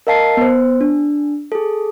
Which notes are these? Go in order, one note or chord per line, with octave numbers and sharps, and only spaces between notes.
A#4 D#5 F5 A5 C7
B3 C5
D4
G#4 A4